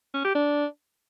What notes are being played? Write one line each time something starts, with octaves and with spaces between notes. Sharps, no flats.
C#4
G4
D4